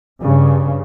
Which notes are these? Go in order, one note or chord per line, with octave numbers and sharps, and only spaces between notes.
G2 C#3